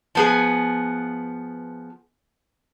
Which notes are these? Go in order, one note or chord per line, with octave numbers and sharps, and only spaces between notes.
F3 B3 G#4